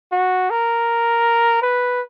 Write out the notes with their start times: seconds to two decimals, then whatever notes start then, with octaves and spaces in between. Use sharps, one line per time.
0.12 F#4
0.51 A#4
1.62 B4